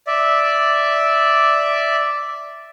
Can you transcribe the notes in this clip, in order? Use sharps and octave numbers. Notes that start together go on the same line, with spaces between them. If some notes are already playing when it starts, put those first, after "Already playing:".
D5 E5